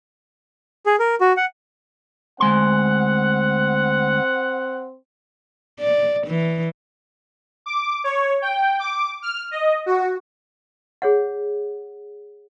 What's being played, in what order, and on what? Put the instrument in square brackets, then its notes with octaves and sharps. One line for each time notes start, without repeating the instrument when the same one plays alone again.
[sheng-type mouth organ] G#4
A#4
F#4
F#5
[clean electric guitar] D2 G#3 C6 [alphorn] C4 [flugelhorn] F#5
[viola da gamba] D5
E3
[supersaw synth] D6
C#5
G5
D6
F6
D#5
F#4
[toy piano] G#4 C#5 F#5